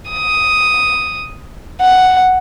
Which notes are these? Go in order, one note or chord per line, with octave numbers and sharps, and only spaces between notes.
D#6
F#5